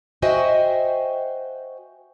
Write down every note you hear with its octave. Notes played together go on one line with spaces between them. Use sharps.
F#4 C5 D#5 E5 G5 G#5